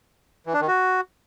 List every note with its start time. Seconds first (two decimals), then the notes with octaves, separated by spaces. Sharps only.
0.46 E3
0.54 D4
0.61 D#3
0.68 F#4